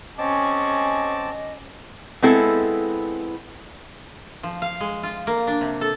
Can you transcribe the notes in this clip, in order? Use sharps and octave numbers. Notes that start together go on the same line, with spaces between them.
C4 C#4 G#4 D#5 A5 D6
G#3 B3 C4 E4 A4
F3
F5
G#3
F4
A#3
D4
C3
A4